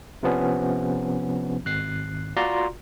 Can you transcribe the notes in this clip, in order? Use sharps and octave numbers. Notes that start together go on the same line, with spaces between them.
C3 F3 B3 C#4
G#1 F#6 C7
F4 F#4 D5 A#5 C6